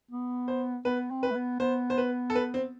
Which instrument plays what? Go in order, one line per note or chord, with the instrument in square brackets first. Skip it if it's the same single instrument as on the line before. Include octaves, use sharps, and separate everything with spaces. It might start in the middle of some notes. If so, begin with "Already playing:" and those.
[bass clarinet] B3
[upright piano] C5
[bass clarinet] B3 [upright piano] B4
[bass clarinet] C4
[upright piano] B4
[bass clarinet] A3
B3
[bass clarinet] B3 [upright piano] C5
[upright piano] C5
B4
A4
B4
C4